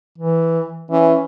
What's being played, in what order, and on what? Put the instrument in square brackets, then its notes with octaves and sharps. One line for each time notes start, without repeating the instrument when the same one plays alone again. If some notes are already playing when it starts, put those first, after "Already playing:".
[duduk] E3
[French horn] E3 [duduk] C#4